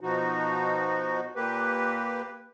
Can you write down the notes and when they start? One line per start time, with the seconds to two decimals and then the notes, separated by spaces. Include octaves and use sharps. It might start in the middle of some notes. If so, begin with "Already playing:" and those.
0.01 B2 F3 D#4 F#4
1.36 A#2 A#3 G4 B4